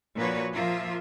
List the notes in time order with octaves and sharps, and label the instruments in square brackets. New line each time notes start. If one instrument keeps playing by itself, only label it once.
[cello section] A#2 F3 D4 F#4 B4 C#5
F3 A#3 F4 E5